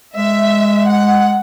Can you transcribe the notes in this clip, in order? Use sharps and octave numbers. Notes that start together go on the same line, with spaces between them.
G#3 E5
F#5